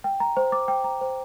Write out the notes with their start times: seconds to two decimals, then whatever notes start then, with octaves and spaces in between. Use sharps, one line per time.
0.04 G5
0.20 A#5
0.37 C5
0.52 D6
0.68 G5
0.84 A#5
1.01 C5